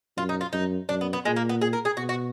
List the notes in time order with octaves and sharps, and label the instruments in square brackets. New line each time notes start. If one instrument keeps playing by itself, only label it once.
[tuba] F#2 [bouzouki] F4
[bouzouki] D#4
F4
[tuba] F#2 [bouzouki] D#4
[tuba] F#2 [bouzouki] D4
[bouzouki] B3
B3
[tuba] A#2 [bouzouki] G#3
[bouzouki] A#3
B3
G#4
A#4
G#4
[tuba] B2 [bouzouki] F#4
[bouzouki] F#4